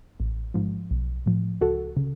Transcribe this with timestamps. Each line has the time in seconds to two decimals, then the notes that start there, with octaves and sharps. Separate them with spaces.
0.20 A1
0.54 G#2 F3
0.91 B1
1.26 A2 F3
1.61 C#2 F#4 A4
1.97 C#3